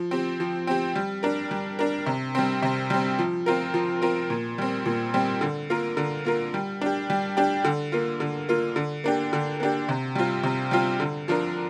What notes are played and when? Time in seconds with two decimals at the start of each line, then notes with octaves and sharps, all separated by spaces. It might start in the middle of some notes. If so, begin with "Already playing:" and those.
Already playing: F3
0.11 C4 G4
0.40 F3
0.67 C4 G4
0.96 G3
1.23 D4 A#4
1.51 G3
1.79 D4 A#4
2.06 C3
2.35 G3 C4
2.62 C3
2.90 G3 C4
3.19 F3
3.46 C4 F4 A#4
3.74 F3
4.02 C4 F4 A#4
4.30 A#2
4.58 G3 C4
4.86 A#2
5.14 G3 C4
5.41 D3
5.70 A#3 F4 A#4
5.97 D3
6.25 A#3 F4 A#4
6.54 G3
6.81 D4 G4
7.10 G3
7.37 D4 G4
7.65 D3
7.92 A#3 F4
8.20 D3
8.49 A#3 F4
8.76 D3
9.04 A#3 D4 G4
9.33 D3
9.60 A#3 D4 G4
9.89 C3
10.15 G3 C4 F4
10.43 C3
10.71 G3 C4 F4
11.00 D3
11.28 F3 D4 F4 A#4